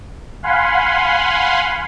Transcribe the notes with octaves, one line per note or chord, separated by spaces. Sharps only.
F5 F#5 G#5 B5 C6